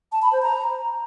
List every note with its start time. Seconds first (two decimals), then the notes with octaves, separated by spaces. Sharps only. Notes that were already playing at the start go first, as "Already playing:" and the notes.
0.12 A5
0.22 B5
0.32 C5
0.42 A#5